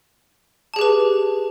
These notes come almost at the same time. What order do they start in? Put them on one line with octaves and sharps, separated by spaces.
A5 G#4 G4 B4